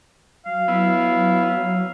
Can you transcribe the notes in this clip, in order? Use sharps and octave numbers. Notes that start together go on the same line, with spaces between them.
F#3 F5
B3 E4